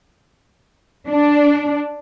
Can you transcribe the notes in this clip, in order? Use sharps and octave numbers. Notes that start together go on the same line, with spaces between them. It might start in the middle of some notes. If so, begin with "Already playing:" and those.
D4